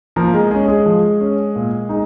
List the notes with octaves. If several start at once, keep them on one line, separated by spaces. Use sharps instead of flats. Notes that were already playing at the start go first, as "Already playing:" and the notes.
F3 A#3 A#4
G#3 G#4
G#3 C#4 G#4
G#3 G#4
F3
C#4
A#2
G#3 D#4